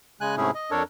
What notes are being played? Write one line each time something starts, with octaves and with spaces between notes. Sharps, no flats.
C#3 G#3 G#5 F#6
G#2 C3 A3 C#4 E4 G#4
D#5
F2 D4 A4 A#4 C#5